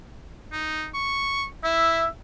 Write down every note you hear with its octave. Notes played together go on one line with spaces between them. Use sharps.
D#4
C#6
E4 E5